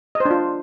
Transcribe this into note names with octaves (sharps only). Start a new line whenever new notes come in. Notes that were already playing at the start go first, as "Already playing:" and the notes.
D#5
C5
D4
F4